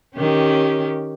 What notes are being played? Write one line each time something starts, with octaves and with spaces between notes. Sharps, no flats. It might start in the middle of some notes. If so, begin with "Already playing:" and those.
D#3 C#4 G4